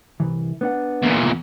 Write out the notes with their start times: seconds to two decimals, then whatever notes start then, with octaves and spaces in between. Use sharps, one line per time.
0.20 C2 E3
0.61 B3 D4 F#5
1.03 E2 A#2